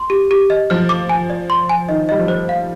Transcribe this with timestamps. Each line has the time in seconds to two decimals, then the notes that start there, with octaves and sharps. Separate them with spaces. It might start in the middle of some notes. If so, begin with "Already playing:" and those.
Already playing: C6
0.10 G4
0.31 G4
0.50 D#5
0.70 F3 F6
0.89 D6
1.09 G#5
1.30 D5
1.50 C6
1.69 G#5
1.89 D#3 D#5
2.09 G3 D#5
2.20 F3
2.28 C5
2.49 F5